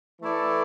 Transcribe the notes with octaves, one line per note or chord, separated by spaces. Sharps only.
E3 A3 E4 A4 D5